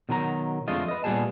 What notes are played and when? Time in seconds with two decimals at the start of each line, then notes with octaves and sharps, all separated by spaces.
0.09 B2 D#3 F#3 A4 A#5
0.68 F2 D3 G#3 A3 F4 D#5
0.88 B4 D#5
1.04 A#2 G3 B3 G#4 A5